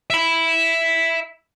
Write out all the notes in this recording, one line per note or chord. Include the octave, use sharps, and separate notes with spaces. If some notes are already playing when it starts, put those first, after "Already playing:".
E5 B5